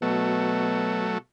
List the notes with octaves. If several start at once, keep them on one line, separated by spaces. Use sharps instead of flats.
B2 F#3 A3